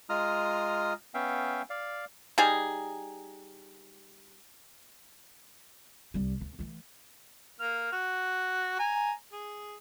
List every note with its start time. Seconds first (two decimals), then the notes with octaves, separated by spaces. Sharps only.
0.09 G#3 F4 A#5 D#6 F6
1.14 B3 C#4 E5 F5 G5
1.70 D5 F5
2.38 G3 D#4 G#4
6.14 C2 G3
6.41 D2
6.59 E3 A3
7.60 A#3 F6
7.93 F#4
8.79 G#5 A#5
9.32 G#4